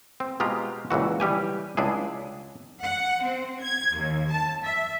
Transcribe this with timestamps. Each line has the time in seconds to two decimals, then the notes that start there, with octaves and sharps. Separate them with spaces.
0.20 C4
0.40 B2 G#3 F4 G4 A#5
0.91 C#2 A#2 E3 F#4
1.20 E3 G3 G4 G#5
1.77 C#2 D4 E4 G#4
2.83 F#5
3.23 C4
3.63 G#6
3.96 D#2
4.30 A5
4.64 E5